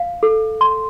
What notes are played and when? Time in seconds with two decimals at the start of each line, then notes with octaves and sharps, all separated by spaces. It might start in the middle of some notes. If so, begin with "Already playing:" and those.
Already playing: F5
0.23 A4
0.61 C6